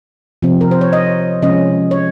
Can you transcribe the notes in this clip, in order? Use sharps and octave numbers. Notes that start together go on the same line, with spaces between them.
C3 F3 C4
A#4
C5
C#5
D#5
C3 F3 G#3 C#4 D#5
C#5